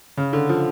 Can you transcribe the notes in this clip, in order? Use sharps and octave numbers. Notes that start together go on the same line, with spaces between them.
C#3
D3
F3